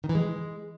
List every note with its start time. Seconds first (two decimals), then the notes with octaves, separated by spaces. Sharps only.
0.04 D#3
0.09 E3
0.15 G#3